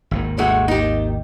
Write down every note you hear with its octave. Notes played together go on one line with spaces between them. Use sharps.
G#1 D#2 D#3
G#3 A3 F#4
D#4 G4